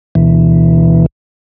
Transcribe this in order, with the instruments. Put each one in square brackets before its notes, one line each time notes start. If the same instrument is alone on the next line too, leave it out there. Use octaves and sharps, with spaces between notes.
[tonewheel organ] D2 B2 E3